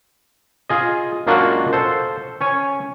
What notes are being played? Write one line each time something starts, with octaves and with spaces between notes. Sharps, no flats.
F4 G#4 D#5
F#2 G#3 A#3 D4 F4 F#4
A4 C5
C#4 C#5 G#5